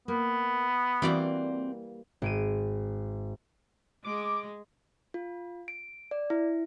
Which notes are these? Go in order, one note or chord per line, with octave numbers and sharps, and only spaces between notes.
A#3 B3
E3 G3 A#3 C4 F#4 D5
G#1 D7 D#7
G#3 D6
F4
D7
D5
E4